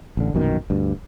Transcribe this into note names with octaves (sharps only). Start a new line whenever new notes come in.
A1 D3
A#1 F#2 B2 D#3
D2 G2